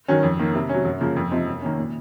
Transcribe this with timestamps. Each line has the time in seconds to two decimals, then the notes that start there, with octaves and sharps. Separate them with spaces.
0.08 D#3 F#3 C#4
0.23 F2
0.39 D#3 A#3
0.55 C3
0.69 F#3 C#4
0.85 F#2
1.00 C#3 F3 A#3
1.16 F2
1.31 C3 F3 C4 D#4
1.47 F#2
1.62 D#3 A#3 C#4
1.78 A#2